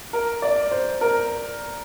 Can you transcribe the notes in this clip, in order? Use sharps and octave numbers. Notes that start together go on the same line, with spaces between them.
A#4
D5
C5
A#4